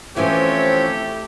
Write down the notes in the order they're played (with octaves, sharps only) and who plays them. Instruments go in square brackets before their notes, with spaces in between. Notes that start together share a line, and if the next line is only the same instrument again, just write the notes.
[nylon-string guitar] E3 F3 C#4 [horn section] A3 E4 G4 [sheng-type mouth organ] C4 C#5